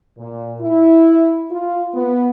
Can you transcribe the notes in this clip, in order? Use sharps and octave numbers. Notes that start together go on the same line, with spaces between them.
A#2
E4
F4
B3